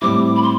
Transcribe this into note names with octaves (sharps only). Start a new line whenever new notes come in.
A2 G3 C4 E4 D6
B5
C6